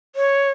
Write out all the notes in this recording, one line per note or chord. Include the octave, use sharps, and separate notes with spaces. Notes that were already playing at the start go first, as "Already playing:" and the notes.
C#5